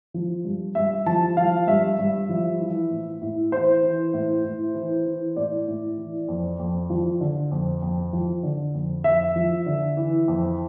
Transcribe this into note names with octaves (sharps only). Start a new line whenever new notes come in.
F3
G2
G2 E5
F3 A5
F3 F5
G2 E5
G2
F3
E3
A2
A2
E3 C5
E3
A2
A2
E3
E3
A2 D5
A2
E3
F2
F2
F3
D3
F2
F2
F3
D3
F2
F2 E5
F3
D3
E3
F2